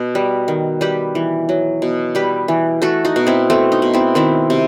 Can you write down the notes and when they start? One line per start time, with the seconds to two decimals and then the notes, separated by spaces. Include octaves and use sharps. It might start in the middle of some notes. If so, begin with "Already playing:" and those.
Already playing: B2
0.15 G3
0.48 D#3
0.81 G3 G4 B4
1.15 E3
1.49 F#3
1.82 B2
2.15 G3 G4 B4
2.48 E3
2.82 A3 F#4 A4
3.05 D#4 F#4
3.16 B2
3.27 C4 E4
3.50 A3 C4
3.72 D#4
3.82 B2
3.93 C4 E4
4.15 D#3 C4 E4
4.50 C3